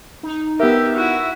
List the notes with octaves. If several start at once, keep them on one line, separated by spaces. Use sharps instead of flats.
D#4
B3 G4 A#4 E5
E4 F#4